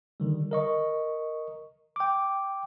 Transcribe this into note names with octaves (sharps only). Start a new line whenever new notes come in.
D3 D#3 G3
A#4 D#5 C#6
G5 D6